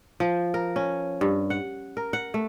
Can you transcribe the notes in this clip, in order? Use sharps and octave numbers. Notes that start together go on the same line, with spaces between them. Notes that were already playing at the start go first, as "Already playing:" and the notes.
F3
A#4
C#4
G2
F#5
A#4
F#5
A3